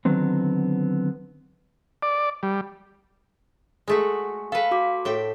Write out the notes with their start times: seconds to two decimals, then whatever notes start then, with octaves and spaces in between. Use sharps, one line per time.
0.05 D3 D#3 F#3 B3 C4
2.03 D5
2.43 G3
3.88 G#3 A3 F#4
4.52 A4 B4 F5
4.71 F#4 D6
5.05 A2 E5 G5